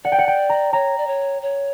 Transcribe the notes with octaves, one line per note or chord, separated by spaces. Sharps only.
D5 F#5
G5
F#5
G5
A#5
C#5 A#5
D5
C#5
C#5